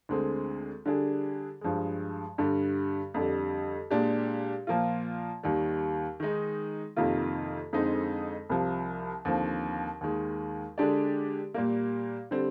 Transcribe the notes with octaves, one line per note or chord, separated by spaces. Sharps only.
D2 D3 G#3 C4
D3 G3 D4 G#4
G2 F3 G#3
G2 D3 G3
F2 D3 G3
A#2 G#3 D4 G4
A#2 F3 A#3 F4
D#2 D#3 G3
D#3 G#3 D#4
F2 C3 D#3 A#3 F4
F2 D3 G#3 C4 D#4
C2 C3 F3
D#2 D3 F3 C4
D#2 D#3 G#3
D3 G#3 D4 G4 D5
A#2 G3 A#3
D3 G3 C4